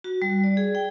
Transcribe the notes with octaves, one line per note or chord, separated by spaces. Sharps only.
F#4
G3
D5
G#4
G5